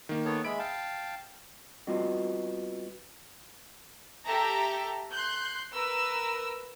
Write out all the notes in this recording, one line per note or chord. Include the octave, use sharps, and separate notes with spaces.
D#3 A#3
B3 A4 C#5
G#3 E5 B5 D7
F5 G5 A5
G3 B3 C4 F4 F#4 D#5
G4 A4 E5 A#5
C6 F#6 G6
A#4 B4 E6